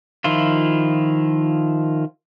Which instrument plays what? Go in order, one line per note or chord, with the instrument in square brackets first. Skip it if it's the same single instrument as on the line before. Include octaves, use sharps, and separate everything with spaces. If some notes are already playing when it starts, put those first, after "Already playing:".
[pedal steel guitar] D#3 F3 E4 F4